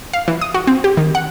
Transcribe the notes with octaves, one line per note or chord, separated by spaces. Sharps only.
F5
E3
D#6
F#4
C4
G4
D#3
F#5